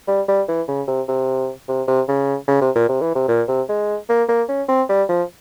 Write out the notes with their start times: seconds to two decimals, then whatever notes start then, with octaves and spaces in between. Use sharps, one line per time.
0.08 G3
0.28 G3
0.48 E3
0.68 C#3
0.88 C3
1.08 C3
1.69 C3
1.88 C3
2.08 C#3
2.48 C#3
2.62 C3
2.75 A#2
2.89 C3
3.01 E3
3.15 C3
3.28 A#2
3.48 C3
3.69 G#3
4.10 A#3
4.29 A#3
4.49 C#4
4.69 C4
4.89 G3
5.09 F3